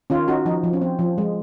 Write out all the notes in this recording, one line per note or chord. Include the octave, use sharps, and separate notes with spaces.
D#3 C#4 F4
C#4 D#4 F#4
F3 D#4
F3
C#4
C4
F3
G#3